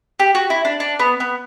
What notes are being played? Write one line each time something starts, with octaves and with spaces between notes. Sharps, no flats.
G4
F#4
E4
D4
D4
B3
B3